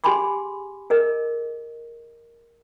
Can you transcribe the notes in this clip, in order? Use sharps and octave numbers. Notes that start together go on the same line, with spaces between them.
G4 G#4 G#5 B5 C6 D6
G#4 A#4 D#5